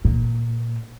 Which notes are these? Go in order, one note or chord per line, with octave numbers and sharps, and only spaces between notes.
A#2